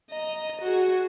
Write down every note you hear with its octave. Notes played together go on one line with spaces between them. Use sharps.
D#5 A#5
F#4 G#4